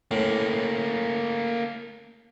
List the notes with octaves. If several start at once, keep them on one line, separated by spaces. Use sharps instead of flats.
A2 A#3 C#4